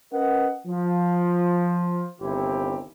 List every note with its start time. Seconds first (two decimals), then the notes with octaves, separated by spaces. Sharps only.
0.13 C#4 A#4 B4 D#5 F#5
0.67 F3
2.21 G1 C2 D#3 C4 E4 G4